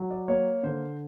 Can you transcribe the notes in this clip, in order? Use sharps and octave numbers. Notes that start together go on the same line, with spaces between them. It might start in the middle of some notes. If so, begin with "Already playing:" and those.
Already playing: F#3
D5
A#3 C#5
D3 C5